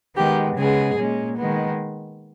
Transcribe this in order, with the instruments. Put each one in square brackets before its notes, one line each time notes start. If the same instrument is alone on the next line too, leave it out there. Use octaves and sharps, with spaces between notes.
[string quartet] D#3 G#3 B3 G4
C#3 G#3 B3 G#4
A#2 G#3 C#4
D#3 G#3 B3